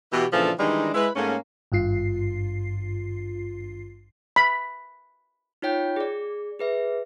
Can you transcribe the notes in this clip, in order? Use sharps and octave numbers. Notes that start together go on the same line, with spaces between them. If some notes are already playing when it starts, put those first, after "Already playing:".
B2 E3 G4
A#2 C#3 E3 F3 D4 A4
D#3 E3 G3 G#3 D4 D#4
G#3 E4 B4
G#2 A3 A#3 C#4
G#1 G2 F4 C7
B5
D#4 F4 C#5 G5 G6
G#4 D5
G#4 B4 E5